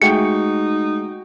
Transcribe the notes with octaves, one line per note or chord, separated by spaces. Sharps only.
G#3 A3 D#4 F#4 G#4 G5 C#7